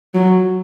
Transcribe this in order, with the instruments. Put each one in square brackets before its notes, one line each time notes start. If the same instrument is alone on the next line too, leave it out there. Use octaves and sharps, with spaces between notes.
[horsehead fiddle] F#3